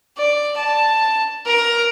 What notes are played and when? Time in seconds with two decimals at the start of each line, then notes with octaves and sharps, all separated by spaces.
0.17 D5
0.57 A5
1.46 A#4